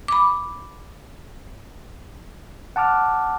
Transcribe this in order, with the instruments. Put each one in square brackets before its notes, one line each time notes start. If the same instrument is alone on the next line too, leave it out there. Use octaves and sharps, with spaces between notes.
[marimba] B5 D6
[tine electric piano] F#5 A5 D6 F6